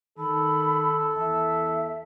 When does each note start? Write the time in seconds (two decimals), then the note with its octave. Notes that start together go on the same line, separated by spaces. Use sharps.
0.18 D#3 A4 B5
1.16 E2 E5